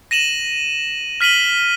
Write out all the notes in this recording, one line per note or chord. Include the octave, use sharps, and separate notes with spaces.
A#6 D#7 E7 F#7
F6 B6 D#7 F#7 G7